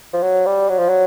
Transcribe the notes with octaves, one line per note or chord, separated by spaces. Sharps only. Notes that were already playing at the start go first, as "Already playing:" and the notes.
F3
F#3
G3
F#3
F3
F#3